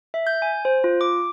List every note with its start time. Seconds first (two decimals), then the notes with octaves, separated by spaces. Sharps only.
0.14 E5
0.27 G6
0.42 G#5
0.65 C5
0.84 F4
1.01 D6